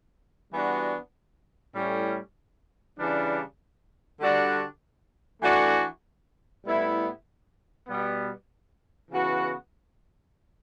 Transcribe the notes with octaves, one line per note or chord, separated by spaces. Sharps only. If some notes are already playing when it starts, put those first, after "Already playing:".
E3 G3 B3 D4 F#4
A2 G3 C#4
C#3 E3 G3 D4
D3 G3 D4 F#4
E3 A3 D4 F#4
A2 G3 B3 E4
B2 G3 B3
C#3 E3 B3 F#4